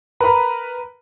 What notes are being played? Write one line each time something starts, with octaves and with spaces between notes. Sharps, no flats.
A#4 B4 A#5 B5